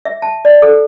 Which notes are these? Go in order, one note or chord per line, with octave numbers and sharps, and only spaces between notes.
E5
A5
D5
A4